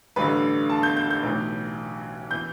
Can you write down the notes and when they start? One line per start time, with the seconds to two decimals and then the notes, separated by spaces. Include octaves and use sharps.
0.16 A1 G2 D3 B4
0.70 A5
0.83 G6
0.97 G6
1.10 G6
1.23 B1 A2 E3
2.31 E3 G6